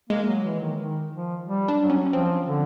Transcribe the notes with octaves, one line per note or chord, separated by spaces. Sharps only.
G#3 A#3
F#3
E3
D#3
D#3
F3
G3
D4
F#3
C#4
C#4
F3 C4
D3